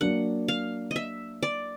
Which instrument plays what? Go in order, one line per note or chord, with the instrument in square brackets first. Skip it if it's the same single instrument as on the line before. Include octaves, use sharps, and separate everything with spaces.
[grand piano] F#3 A#3 D4 [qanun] F#5
[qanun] F5
D#5
E5
D5